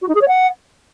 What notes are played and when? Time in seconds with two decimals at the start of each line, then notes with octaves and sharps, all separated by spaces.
0.02 F#4
0.08 D#4
0.15 G#4
0.21 C#5
0.28 F#5